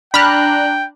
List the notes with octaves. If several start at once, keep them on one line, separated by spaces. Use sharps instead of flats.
D4 G5 A#5 B5 F6 F#6